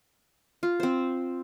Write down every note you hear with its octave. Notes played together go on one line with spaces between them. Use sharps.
F4
C4 C5